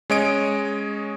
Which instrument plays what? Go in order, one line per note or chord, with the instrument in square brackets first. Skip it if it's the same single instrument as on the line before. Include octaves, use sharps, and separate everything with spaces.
[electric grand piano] G#3 C#4 C#5 D#5 D#6 D7